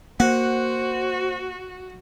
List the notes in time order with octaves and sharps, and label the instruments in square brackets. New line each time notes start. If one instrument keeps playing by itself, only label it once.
[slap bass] A#3 [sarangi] F#4 [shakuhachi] C5 [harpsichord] F#5